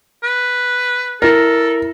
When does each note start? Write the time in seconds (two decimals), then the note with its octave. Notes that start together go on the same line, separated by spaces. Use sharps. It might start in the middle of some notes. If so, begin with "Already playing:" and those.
0.23 B4
1.22 E4 A4 A#4 A#6